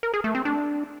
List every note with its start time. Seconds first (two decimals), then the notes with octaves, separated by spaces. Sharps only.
0.03 A#4
0.14 G#4
0.24 A3
0.35 C4
0.45 D4